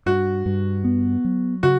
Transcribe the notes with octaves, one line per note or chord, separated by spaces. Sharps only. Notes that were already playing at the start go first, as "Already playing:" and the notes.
G2 F#4
G2
B3
F#3
C#3 F#4